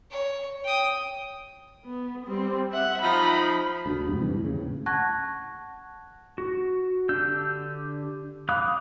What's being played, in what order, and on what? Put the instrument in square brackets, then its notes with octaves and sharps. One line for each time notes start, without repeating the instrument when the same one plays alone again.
[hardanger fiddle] C#5
G5 D#6
[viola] B3
G3 C4
E5 F#5
[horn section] F3 D#4 [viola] B5
[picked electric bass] D2 D3
F2 G#2 C3
D2 G2 E3
D#2 A2 C#3
[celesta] F#5 A5 C#6 F#6 G#6 A#6
[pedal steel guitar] F#4
D3 D4 G4 E6 G6
F5 B5 D6 D#6 F#6